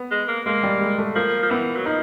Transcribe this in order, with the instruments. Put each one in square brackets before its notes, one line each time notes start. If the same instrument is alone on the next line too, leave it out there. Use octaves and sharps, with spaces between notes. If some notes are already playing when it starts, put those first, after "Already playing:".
Already playing: [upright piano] B3
[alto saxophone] G#3
A#3
[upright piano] G#3 [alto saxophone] A#3
[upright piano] G3
G#3
A3
[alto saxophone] F3 [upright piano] A#3
[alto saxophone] F3
[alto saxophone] E3 [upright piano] B3
[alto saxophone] F#3
[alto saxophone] F3 [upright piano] D#4